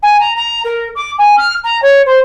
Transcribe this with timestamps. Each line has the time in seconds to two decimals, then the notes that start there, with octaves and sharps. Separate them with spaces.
0.03 G#5
0.20 A#5
0.36 A#5
0.65 A#4
0.96 D6
1.19 G#5
1.38 F6
1.64 A#5
1.83 C#5
2.06 C5